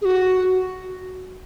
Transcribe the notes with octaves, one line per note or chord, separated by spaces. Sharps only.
G#4
F#4